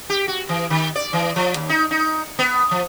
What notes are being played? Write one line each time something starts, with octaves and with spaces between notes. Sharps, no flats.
G4
F#4
E3
D#3
D5
E3
F3
D#2
D#4
D#4
B3
F3